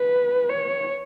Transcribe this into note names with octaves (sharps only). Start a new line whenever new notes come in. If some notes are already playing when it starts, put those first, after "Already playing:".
Already playing: B4
C#5